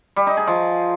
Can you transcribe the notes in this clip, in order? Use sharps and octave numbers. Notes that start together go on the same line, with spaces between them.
G3
D#4
G#4
F3